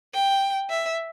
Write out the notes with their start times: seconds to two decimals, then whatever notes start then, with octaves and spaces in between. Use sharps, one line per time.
0.14 G5
0.70 E5